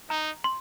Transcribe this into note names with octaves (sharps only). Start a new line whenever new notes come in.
D#4 A#5
C6